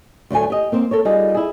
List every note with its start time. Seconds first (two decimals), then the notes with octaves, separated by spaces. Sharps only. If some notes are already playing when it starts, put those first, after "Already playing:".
0.30 D2 A2 F#3 A4 G#5
0.50 G4 D#5
0.72 A#3 C4 C5
0.91 A4 A#4 C#5
1.05 G3 D#4 F4 G#4
1.34 E4 G#4